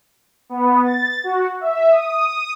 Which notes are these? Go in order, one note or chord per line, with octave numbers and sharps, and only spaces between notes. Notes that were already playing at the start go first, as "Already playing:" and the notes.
B3
A6
F#4
E5
D#6